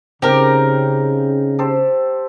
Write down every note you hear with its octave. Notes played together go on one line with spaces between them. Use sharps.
C#3 C4 D#4 G4 A#4
G4 A4 C5